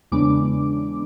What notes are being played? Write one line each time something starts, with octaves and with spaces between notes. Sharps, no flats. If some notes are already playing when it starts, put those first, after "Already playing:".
E2 C#3 G#3 B3 D4 D6